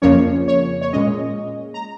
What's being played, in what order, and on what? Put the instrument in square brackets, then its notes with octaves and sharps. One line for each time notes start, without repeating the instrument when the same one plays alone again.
[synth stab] F2 C#3 F3 A#3 C#4 C#5
C#5
C#5
A#2 G#3 C#4 D#5
A#5